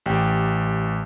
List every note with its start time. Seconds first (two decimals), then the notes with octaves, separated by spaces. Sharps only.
0.06 A1 G4 G5